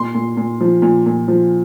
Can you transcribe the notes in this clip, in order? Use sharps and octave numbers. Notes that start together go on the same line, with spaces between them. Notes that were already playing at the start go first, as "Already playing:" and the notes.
Already playing: A#2 C6
A#2
A#2
F3
A#2
A#2
F3